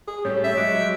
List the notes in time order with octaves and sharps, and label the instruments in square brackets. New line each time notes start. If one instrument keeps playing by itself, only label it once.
[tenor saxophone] G#4
[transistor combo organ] A2 G3 [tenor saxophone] C#4
[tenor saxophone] C#4 [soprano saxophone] E5
[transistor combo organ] F#3 D6 [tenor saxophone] G#3